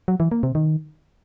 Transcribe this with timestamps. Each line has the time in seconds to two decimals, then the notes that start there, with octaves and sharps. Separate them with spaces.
0.08 F#3
0.20 E3
0.31 A#3
0.43 C3
0.55 D#3